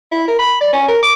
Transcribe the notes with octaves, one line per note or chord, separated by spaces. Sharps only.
E4
A#4
B5
D5
C#4
A#4
D6